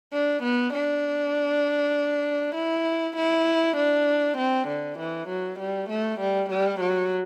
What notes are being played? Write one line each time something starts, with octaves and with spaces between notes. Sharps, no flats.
D4
B3
D4
E4
E4
D4
C4
D3
E3
F#3
G3
A3
G3
G3
F#3